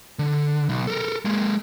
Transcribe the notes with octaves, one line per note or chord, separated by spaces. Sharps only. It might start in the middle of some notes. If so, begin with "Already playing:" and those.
D3
B1
A4 A#4
G#3 A#3